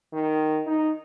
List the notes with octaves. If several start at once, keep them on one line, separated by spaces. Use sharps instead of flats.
D#3
D#4